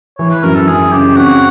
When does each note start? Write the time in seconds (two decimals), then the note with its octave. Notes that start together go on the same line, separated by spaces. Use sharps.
0.18 E3 C#5
0.31 B4
0.44 F#2 A#4
0.55 A4
0.67 F#2 G#4
0.92 C#3 G4
1.17 C4 F#4